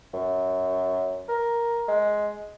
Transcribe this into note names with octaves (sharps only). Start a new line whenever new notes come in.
F#2
A#4
G#3